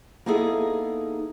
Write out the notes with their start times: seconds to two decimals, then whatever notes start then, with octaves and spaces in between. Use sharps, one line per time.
0.26 A#3 B3 D#4 E4 G#4 A4